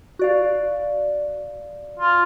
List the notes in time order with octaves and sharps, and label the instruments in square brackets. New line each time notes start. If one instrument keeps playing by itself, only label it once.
[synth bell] F#4 D5 F5
[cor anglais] F4